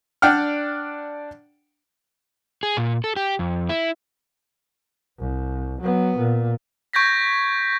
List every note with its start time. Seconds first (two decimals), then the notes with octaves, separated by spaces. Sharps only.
0.22 D4 D5 F#5 G5 F6
2.63 G#4
2.77 A#2
3.04 A4
3.16 G4
3.39 F2
3.69 E4
5.19 C2
5.81 F#3 B3
6.18 A#2
6.93 C#6 G6 G#6 A#6 B6